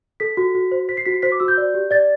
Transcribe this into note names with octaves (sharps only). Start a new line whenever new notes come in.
A4 B6
F#4
F#4
C5
C5 B6
C7
F#4 B6
C7
C5 B6
D6
F#4 E6
G6
D5
G4
D5 A6